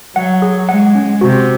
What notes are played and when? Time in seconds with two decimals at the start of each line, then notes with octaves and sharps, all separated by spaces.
0.16 F#3 F#5
0.42 G#4
0.69 G#3 F#5
0.95 C#4
1.21 C3 F#4